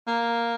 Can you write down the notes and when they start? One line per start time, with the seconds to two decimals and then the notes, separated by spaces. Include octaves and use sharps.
0.07 A#3